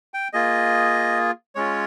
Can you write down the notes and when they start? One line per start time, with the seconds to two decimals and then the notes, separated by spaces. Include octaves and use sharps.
0.14 G5
0.33 A#3 F4 G#4 D#5
1.55 G#3 C#4 F4 C#5